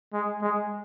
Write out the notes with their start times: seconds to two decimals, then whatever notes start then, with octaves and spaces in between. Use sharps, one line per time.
0.13 G#3
0.42 G#3